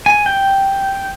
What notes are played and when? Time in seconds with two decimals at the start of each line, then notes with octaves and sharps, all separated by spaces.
0.06 G#5
0.26 G5